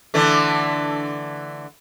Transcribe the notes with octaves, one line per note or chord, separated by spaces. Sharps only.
D3 E3 A3